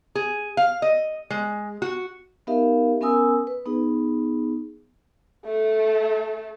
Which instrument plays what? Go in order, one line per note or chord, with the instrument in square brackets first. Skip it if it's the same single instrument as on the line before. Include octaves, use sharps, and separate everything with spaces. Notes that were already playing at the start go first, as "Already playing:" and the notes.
[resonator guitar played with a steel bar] G#4
F5
D#5
G#3
F#4
[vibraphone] B3 D#4 G4 A#4 E5 F5
B3 C#4 A#4 G#5 D#6 E6
B4
B3 D#4 G#4
[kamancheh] A3 A4